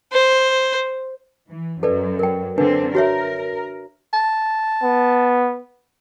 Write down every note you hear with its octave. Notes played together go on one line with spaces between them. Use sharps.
C5
E3
F#2 A4 B4 D5
A#4 G5
D3 C4 D4 B4
F#4 A#4 C#5 E5
A5
B3